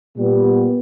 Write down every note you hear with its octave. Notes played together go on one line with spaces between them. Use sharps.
A#2 G3 B3